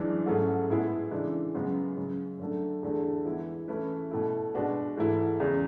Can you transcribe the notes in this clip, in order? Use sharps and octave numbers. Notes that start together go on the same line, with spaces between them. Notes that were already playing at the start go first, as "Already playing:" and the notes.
Already playing: F#2 E3 G#3 D4
G#2 F#3 A3 C#4 G#4
A2 G#3 B3 E4 G#4
C#3 E3 G#3 D4
F#2 C#3 G#3 B3
F#2 C#3 G#3
F#2 D3 A3
E2 D3 A3
E3 G#3 B3 E4
E3 A3 C#4 E4 B4
B2 A3 E4
B2 G#3 D4 F#4 B4
G#2 E3 A3 E4
E2 C#3 G#3